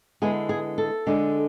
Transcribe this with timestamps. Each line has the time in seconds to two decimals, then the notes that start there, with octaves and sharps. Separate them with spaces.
0.22 D3 G#3 B3 E4 G#4
0.49 G#4
0.78 A4
1.07 D3 G#3 D4